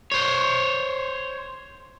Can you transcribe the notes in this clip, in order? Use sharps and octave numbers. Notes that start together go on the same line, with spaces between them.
C5 C#5